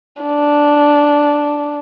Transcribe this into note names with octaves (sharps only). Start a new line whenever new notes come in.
D4